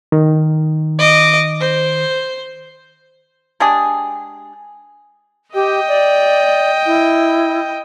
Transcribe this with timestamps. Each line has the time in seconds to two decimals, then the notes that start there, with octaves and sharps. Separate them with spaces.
0.12 D#3
0.99 D#5 D6
1.61 C5
3.60 G#3 D4 G4 G#4
5.54 G4 D#5 G5
5.88 D5
6.86 E4